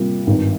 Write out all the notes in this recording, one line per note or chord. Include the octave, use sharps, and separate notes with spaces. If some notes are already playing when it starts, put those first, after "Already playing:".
Already playing: C3 G3 A#3 F4
G#1 G2 D#3